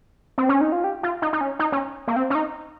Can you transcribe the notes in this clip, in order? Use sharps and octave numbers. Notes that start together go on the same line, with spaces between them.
C4
C#4
D#4
F4
G4
F4
D#4
D#4
C#4
D#4
C#4
A#3
C4
C#4
D#4